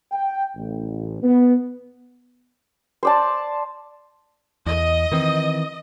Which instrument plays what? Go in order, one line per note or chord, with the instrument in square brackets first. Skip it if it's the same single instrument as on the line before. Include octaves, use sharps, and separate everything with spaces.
[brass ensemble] G5
A1
B3
[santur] C5 D5 A5
[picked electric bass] E2 [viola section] D#5
[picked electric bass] D#3 E3 C4